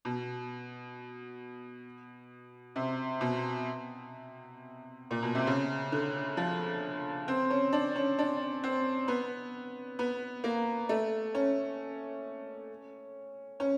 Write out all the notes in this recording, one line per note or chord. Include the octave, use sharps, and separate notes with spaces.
B2
C3
B2
A#2
B2
C3
C#3
D3
F3
C4
C#4
D4
C#4
D4
C4
B3
B3
A#3
A3
C#4
C#4